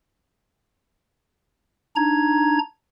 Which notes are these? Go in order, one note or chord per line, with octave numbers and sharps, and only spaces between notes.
D4 D#4 A#5 G#6